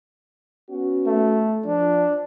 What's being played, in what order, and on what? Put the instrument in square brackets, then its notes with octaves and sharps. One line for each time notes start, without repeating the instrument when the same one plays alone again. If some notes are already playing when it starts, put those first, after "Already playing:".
[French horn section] B3 C#4 F#4
[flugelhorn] A3
[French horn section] F3 [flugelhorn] D4